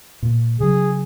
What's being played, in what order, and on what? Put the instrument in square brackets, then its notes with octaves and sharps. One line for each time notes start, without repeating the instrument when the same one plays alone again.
[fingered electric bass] A#2
[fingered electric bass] C#3 F#3 [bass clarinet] G#4